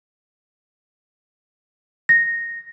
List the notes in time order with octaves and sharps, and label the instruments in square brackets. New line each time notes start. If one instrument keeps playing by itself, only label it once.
[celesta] A#6